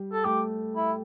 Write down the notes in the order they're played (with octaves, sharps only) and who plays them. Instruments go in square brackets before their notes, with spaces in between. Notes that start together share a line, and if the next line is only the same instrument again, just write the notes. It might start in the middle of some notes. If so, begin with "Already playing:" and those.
Already playing: [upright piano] G3
[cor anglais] A4
[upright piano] A3 [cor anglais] G4
[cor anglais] E4